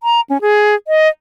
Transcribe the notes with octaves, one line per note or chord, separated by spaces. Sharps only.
A#5
C#4
G#4
D#5